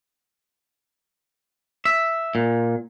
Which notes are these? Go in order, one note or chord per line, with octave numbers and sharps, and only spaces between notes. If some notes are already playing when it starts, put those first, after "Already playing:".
E5
A#2